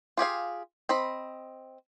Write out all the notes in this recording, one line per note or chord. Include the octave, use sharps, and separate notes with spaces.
F4 G4 G#4 F5
C4 D#5 B5